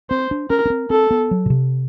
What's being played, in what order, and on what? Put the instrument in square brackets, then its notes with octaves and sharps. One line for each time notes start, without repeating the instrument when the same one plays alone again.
[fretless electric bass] C4 [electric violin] C5
[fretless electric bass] D4
[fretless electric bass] C#4 [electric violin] A#4
[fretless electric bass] C#4
C4
[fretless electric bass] C4 [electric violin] A4
[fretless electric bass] B3
F#3
B2
C3